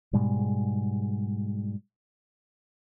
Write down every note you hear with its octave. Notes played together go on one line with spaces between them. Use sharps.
G#2 B2 G3 G#3